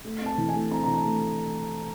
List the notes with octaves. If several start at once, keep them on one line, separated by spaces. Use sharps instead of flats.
A3
C4
A5
E3
A3 G#5
C4 A#5
E3 A#5
A5
A3